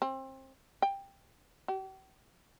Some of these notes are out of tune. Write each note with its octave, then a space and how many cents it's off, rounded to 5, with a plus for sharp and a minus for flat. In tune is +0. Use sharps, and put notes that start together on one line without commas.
C4 +30
G5 +10
G4 -45